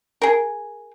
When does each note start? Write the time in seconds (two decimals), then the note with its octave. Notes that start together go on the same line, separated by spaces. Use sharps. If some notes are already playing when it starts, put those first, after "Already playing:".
0.21 G#4 A#4